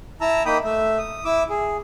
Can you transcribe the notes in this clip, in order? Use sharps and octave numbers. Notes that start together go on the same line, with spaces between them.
E4 A5 A#5 E6
A#3 D#4 G5 B5 D#6
A3 E5
D#6
E4 D6 E6
G#4